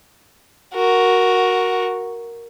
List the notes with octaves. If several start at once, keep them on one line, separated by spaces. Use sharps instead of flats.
F#4 A#4